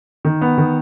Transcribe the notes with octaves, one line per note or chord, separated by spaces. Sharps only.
D#3
B3
D#3